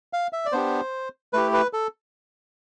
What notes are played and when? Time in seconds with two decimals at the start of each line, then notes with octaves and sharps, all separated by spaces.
0.13 F5
0.33 E5
0.46 D5
0.52 B3 D4 G4 C5
1.33 A3 E4 G4 B4
1.53 B4
1.73 A4